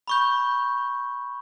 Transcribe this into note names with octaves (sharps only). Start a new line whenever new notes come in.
B5 C#6 G6